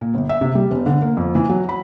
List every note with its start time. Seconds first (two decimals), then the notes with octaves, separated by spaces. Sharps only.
0.01 A#2
0.14 G1
0.29 E5
0.41 C3
0.55 G3
0.71 E1
0.86 D3
1.02 A#3
1.17 F2
1.35 E3
1.49 F#3
1.69 B5